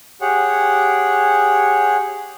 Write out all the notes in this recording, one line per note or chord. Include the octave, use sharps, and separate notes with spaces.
G4 G#4 C#5 F#5